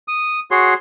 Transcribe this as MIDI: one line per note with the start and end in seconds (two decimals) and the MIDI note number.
0.08 0.40 87
0.51 0.74 66
0.51 0.74 68
0.51 0.74 73
0.51 0.74 84